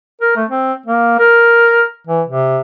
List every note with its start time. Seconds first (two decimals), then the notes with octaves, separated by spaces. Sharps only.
0.21 A#4
0.36 A3
0.50 C4
0.86 A#3
1.19 A#4
2.07 E3
2.27 C3